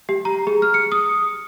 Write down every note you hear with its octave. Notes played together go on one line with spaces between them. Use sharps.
G4
A#5
G#4
F6
C#7
D#6